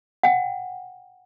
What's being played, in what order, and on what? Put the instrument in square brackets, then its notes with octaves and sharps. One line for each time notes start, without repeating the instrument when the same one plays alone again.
[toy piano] F#5 G5